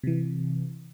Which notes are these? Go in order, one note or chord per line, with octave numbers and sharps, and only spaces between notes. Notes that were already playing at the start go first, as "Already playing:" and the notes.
C3 E3